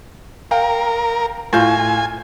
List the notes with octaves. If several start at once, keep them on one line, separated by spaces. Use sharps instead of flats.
A#4 F5 G5
A2 F4 G#5 G6